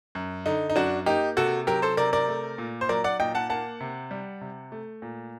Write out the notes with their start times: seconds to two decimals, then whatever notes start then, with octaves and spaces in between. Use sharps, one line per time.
0.15 F#2
0.46 D3 D#4
0.70 D#4
0.76 F#2 D4 F#4
1.06 A#3 D#4 G4
1.37 C3 F#4 A4
1.67 F#3 G4 A#4
1.82 A4 C5
1.97 C3 A#4 D5
2.13 A#4 D5
2.28 A3
2.58 A#2
2.81 C5
2.89 F#3 A#4 D5
3.04 D5 F#5
3.20 A#2 D#5 G5
3.35 F#5 A5
3.50 A#3 F#5 A5
3.80 C3
4.11 G3
4.41 C3
4.72 A3
5.02 A#2